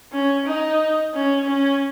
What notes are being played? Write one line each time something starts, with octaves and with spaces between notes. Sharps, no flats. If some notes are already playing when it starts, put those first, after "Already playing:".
C#4
D#4
C#4
C#4